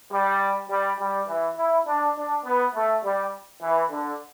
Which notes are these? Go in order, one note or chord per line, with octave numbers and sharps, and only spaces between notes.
G3
G3
G3
E3
E4
D4
D4
B3
A3
G3
E3
D3